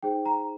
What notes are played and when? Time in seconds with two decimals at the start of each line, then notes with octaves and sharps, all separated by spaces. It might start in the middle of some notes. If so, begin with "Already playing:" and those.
0.03 D#4 G#4 C5 G5
0.26 A#5